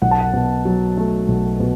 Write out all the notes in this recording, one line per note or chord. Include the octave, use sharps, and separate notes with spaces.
B1 F#5
A5
F#5
B2
F#3
A3
B1
B2